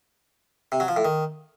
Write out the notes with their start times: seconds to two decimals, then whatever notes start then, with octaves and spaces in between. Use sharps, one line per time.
0.72 C3
0.80 F#3
0.88 F3
0.96 A2
1.05 D#3